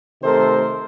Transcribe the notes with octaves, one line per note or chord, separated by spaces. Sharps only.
C3 D#3 A3 A4 A#4 C5